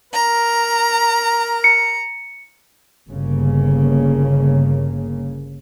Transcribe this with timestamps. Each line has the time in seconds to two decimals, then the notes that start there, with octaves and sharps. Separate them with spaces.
0.13 A#4 A#5
1.64 C#7
3.08 G1 C#3 A#3